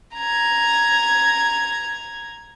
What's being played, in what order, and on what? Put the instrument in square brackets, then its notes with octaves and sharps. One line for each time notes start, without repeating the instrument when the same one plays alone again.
[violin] A#5 G#6